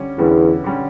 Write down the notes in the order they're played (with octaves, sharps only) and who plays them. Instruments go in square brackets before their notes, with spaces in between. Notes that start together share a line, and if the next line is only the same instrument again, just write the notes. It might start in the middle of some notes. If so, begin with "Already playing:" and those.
Already playing: [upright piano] D3 G3 C#4
[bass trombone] E2 [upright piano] D3 G3 C#4
[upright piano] D3 G3 C#4